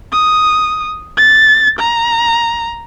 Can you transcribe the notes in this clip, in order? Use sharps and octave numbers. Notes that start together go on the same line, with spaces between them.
D#6
A6
A#5